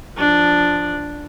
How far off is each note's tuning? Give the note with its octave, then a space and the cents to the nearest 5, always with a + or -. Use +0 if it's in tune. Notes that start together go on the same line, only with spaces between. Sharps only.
F3 +0 D4 +0